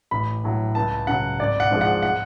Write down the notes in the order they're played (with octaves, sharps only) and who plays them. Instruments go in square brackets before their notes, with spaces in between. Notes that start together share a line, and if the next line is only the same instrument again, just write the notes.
[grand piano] A1 B5
A2 F#3
C#2 A5
C#3 F#3 F#5
G#1 D5
F#5
G#2 F3 G#3
F#5
F#5